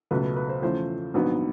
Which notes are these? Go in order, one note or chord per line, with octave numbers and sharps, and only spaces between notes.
C#2 B2 F#3 A3 B4
B4
B4
C5
E2 C#3 F3 A3 C5
A#1 G#2 D#3 F#3 B3